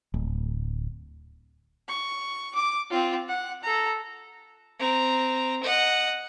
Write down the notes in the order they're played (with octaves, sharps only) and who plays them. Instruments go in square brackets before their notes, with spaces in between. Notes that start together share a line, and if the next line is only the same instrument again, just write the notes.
[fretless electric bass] D1
[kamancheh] C#6
D6
C4 F4
F#5
A4 A#5
[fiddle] C4 A#5
D#5 F#5